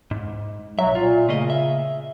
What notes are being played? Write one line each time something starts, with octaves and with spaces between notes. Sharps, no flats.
G#2
B1 F#3 E5
A#2 F4
C#3 A3 A#3 D#5
E5